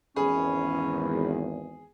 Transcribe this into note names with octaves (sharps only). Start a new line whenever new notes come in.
G#1 E2 C#4 G#4 B5